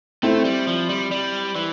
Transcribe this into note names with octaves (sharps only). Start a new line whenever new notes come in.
A3 C4 E4
G3
F3
G3
G3
E3